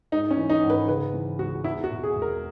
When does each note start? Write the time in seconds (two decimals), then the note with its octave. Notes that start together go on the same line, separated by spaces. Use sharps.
0.12 G#2 D#4
0.31 C#4
0.37 E3
0.50 D#4
0.63 G#1
0.70 B4
0.88 C#3 B4
1.14 E3
1.39 C#2 F#4
1.64 E2 E4
1.84 F#4
1.91 B2
2.04 G#4
2.16 E1
2.22 A#4